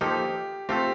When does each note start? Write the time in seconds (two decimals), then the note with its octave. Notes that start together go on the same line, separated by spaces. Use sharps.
0.01 F3 A#3 D#4 G4 A4
0.69 A3 C4 F4 G4 A4